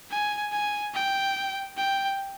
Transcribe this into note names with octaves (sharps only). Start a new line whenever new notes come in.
G#5
G#5
G5
G5